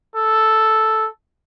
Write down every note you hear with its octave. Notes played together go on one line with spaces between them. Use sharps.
A4